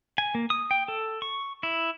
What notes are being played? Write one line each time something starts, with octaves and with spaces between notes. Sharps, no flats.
G#5
A#3
D#6
G5
A4
C#6
E4